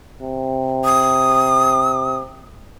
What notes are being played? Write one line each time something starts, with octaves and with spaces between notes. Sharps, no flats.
C3
D#6